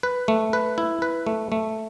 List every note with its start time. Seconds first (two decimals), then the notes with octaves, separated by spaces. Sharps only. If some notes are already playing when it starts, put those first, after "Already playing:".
0.03 B4
0.28 A3
0.53 B4
0.78 E4
1.02 B4
1.27 A3
1.52 A3